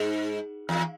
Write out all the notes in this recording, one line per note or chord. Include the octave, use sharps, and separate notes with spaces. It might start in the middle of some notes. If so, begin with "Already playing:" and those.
Already playing: G#2
E2